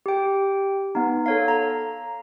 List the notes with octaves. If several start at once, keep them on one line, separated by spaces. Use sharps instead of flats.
G4 G5
B3 D#4
A4 C#5 F5
A#5